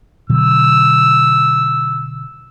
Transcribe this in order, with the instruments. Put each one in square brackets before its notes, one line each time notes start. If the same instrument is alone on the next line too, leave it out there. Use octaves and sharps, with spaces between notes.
[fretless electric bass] B2 D3 F#3 [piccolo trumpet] E6